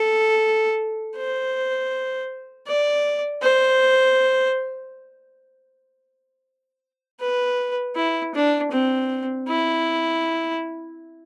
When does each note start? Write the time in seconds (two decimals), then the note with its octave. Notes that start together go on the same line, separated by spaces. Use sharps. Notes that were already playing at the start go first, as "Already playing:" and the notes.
Already playing: A4
1.16 C5
2.67 D5
3.42 C5
7.21 B4
7.96 E4
8.34 D4
8.71 C4
9.48 E4